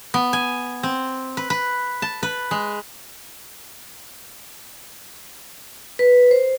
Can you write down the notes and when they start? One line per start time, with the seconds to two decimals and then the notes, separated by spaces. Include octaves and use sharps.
0.14 B3
0.33 G#5
0.83 C4
1.37 B4
1.50 B4
2.02 A5
2.23 B4
2.51 G#3
5.99 B4
6.31 C5